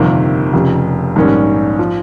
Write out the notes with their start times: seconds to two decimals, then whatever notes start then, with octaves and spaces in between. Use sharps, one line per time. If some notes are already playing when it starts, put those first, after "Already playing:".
Already playing: G1 F2 C3 D#3 A#3
0.53 F1 F2 C#3
1.16 A#1 G#2 D#3 G3 C#4
1.79 F3